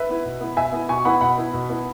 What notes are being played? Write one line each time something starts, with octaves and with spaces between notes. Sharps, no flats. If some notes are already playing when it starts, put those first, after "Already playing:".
Already playing: B4 E5
B3 E4
B2
B3 E4
B2 E5 G#5
B3 E4
B2 G#5 C#6
B3 E4 F#5 B5
B2 F#5 B5
B3 E4
B2
B3 E4